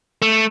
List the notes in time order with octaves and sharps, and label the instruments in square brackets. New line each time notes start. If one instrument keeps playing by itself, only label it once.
[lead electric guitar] A3